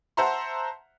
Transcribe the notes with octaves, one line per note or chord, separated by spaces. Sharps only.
C5 E5 F#5 A5 A#5 C6